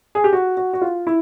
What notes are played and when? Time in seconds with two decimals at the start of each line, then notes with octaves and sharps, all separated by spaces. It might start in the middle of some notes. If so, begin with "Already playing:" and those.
0.15 G#4
0.24 G4
0.33 F#4
0.57 F#4
0.73 F#4
0.81 F4
1.07 E4